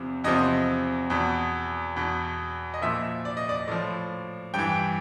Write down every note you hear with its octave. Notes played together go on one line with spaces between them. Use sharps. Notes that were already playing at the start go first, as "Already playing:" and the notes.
Already playing: E2 C3 F3
E2 C3 F3 D#5
E2 B2
E2 B2
D#5
A#2 F3 E5
D5
D#5
D5
A2 F3 D5
G2 E3 G5